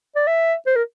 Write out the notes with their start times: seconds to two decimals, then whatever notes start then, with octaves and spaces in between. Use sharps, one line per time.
0.16 D5
0.27 E5
0.67 C5
0.76 A#4